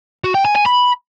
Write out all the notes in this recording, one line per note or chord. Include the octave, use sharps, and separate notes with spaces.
F#4
G5
G#5
G#5
B5